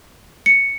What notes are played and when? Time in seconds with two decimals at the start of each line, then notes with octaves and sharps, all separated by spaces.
0.46 C#7